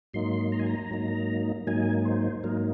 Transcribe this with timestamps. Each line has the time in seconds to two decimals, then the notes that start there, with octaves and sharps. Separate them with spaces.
0.14 G#2 F#3 A#3 D#4 C6
0.52 A#5
0.59 G#5
0.67 A#5
0.91 G#2 F#3 A#3 D#4
1.67 G#2 F#3 A#3 D#4 G#5
2.05 C5
2.44 G#2 F#3 A#3 D#4 A#4